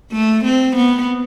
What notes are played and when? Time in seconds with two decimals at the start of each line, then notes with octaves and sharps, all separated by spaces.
0.12 A3
0.44 C4
0.76 B3